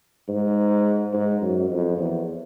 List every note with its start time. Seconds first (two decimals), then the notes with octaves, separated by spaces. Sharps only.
0.28 G#2
1.13 G#2
1.41 F#2
1.69 F2
1.98 E2